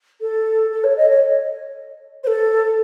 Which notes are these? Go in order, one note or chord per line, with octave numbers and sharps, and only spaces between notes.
A4
A4
C#5
D#5
C#5
C5
A4